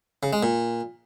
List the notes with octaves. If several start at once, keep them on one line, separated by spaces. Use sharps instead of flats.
C#3
G#3
A#2